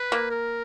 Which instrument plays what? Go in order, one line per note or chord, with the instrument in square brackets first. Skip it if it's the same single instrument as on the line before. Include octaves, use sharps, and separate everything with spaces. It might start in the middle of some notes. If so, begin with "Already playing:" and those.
Already playing: [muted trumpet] B4
[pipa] A#3
[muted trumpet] A#4